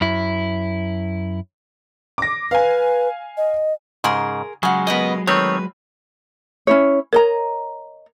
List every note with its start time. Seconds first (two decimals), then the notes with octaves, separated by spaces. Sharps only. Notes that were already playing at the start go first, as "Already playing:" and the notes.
0.01 F#2 E4
2.18 D6 A#6
2.51 B4 F5 G#5
3.37 D#5
4.04 G#2 C#3 G#4 A#4 C6
4.63 C#3 F#3 G#3 F#5 G#5
4.87 B3 A#4 B4 D#5 G#5
5.27 D#3 A3 C4 B4 C#5
6.67 C#4 E4 C#5
7.13 A#4 C#5 D#5 A#5